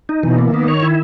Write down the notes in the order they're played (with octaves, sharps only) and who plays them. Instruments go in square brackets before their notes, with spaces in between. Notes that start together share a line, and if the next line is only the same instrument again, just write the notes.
[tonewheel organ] D#4
[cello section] B2 [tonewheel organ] E3
[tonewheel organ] A#3
[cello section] D#3 [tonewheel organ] B3
[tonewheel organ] C#5
E4